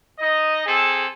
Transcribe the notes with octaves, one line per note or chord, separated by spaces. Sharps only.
D#4 D#5
C4 G#4 A4